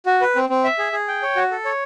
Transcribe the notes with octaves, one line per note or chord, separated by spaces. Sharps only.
F#4
B4
C4
C4
E5
G#4
G#4
G5
C#5
F#4
A4
C#5